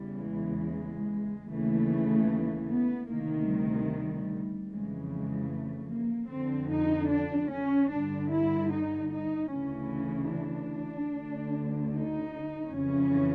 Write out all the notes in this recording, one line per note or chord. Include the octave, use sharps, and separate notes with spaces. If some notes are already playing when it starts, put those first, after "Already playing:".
Already playing: E2 C#3 E3 G3
G#3
D#2 C#3 E3 A3
B3
D2 C3 D#3 A#3
G3
F2 C#3 E3 G#3
G#3
A3
A#3
F2 D3 C4
D#4
D4
C#4
G2 D3 D4
E4
D#4
D#4
D2 C#3 E3 C#4
D4
D2 D3
D#4
F2 C#3 E3 C#4